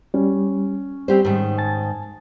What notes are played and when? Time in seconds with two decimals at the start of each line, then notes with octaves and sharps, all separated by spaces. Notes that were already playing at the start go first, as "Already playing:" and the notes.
0.14 G3 C#4
1.08 G3 C4 G4 C5
1.25 G#2 D#3
1.58 G#5 A5 A6